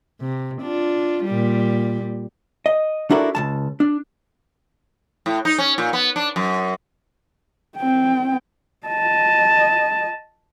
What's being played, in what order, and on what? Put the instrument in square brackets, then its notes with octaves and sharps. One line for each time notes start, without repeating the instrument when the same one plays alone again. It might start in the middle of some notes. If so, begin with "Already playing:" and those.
[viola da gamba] C3
D4 F4
A#2 G3
[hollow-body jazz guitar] D#5
D4 E4 F#4 A4 A#4 D5
C#2 C3 A5
D4
[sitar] A2
D#4
C#4
A#2
B3
D4
F#2
[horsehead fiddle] C4 G5
D#5 A5